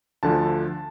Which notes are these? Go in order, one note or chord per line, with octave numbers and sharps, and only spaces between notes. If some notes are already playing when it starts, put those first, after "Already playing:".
D2 D3 F3 A5